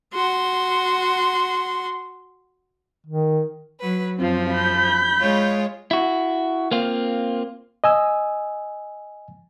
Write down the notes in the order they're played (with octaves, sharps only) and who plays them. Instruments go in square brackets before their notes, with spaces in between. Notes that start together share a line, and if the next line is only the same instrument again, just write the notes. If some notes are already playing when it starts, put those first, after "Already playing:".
[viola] F#4 C6
[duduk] D#3
[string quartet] F#3 B4
[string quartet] F#2 F3 [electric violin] C4 F4
[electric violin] B5 G6
[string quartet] G#3 F4 C#5
[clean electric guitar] E4 F#4
A#3 C4 F4
[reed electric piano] D#5 G#5 E6